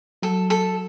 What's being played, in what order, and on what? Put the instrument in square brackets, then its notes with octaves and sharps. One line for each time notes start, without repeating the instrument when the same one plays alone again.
[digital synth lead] F#3 [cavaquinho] A4
[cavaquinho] A4